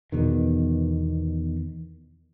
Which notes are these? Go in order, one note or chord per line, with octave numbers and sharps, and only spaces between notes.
E2 B2 D#3